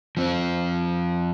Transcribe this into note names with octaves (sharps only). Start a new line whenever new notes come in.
F3 C4